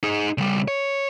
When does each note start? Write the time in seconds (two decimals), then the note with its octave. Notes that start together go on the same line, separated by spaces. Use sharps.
0.04 D#4 G#4
0.38 C#3 G3
0.68 C#5